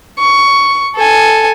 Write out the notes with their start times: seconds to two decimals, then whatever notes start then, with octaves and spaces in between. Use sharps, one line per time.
0.19 C#6
0.96 A4 G#5